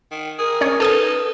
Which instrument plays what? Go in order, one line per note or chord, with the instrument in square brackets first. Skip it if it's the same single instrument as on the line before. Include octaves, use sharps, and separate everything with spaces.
[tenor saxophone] D#3
[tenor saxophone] G#4 [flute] A#4
[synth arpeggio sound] C#4 C#5
[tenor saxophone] D#4 [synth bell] A4 B4 [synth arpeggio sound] A5 D#6 G#6